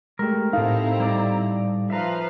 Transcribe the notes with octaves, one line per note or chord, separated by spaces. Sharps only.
G#3 A3 G4 A#4
A2 C4 D#4 E4 G4 A4 F5 A#5
G3 D5
F3 B4 E5 F5 A#5